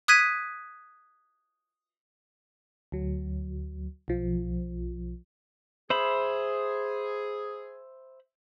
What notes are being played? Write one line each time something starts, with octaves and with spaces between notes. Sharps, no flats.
D#6 F#6 G#6 B6 D#7
D2 F#3
B1 F3
G#4 C5 E5 B5